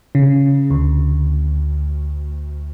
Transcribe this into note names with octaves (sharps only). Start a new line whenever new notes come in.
C#3
D2